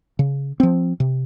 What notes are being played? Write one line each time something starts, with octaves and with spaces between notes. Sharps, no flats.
C#3
F3 C4
C3